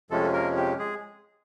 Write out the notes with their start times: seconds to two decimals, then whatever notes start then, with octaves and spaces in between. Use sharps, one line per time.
0.11 F2 C3 F3 G#3 A3 C#4 A4
0.33 A#3 A#4
0.57 G4
0.79 G#3 G#4